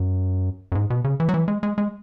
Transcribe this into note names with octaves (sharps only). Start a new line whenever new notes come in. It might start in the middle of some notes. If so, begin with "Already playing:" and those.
Already playing: F#2
F#2
G#2
B2
C#3
E3
F#3
E3
G#3
G#3
G#3